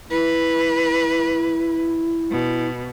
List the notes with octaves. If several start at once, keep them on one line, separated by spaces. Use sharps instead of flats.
E4 B4
B2